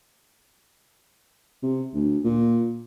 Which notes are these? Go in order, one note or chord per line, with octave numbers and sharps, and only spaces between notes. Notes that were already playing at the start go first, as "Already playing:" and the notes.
C3
D2
A#2